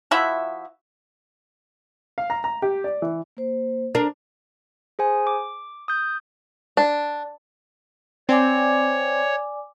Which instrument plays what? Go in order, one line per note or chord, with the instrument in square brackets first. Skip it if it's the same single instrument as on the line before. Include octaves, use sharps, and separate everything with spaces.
[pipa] F3 E4 F#4 E5
[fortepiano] F5
A#5
A#5
G4
D5
E3
[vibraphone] A#3 C5
[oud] D4 A#4
[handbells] G#4 C5 G#5
D6
D#6 G6
[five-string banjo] D4
[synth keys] C4 [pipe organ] C#5 [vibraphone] D5 G#5 D6